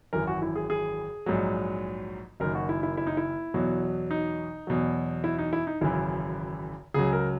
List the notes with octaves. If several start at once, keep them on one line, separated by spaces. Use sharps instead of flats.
G#1 F#2 E3 A#4
F#4
E4
G#4
G#4
A#1 G#2 F#3
F#1 F#2 D#3 A#4
F#4
E4
E4
E4
D#4
E4
E2 B2 F#3
D#4
E2 B2 F#3
E4
D#4
E4
D#4
G#1 F#2 C#3 E3 E4
C#2 C#3 F#3 G#4
A#4